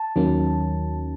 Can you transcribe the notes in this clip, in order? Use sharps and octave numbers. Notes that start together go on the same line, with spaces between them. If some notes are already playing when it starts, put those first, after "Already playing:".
Already playing: A5
D#2 D#3 F#3 A#3 C#4